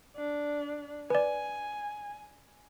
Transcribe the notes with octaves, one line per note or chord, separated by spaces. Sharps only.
D4
B4 D5 G#5